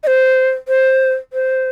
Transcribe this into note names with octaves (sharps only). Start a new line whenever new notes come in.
D#5
C5
C5
C5